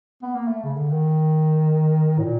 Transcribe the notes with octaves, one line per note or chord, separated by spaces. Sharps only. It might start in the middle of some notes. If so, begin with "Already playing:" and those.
B3
A#3
A3
C#3
D3
D#3
A2
A#2